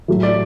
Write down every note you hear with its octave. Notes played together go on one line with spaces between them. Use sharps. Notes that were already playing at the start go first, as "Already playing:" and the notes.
A2 F#3 A3
D5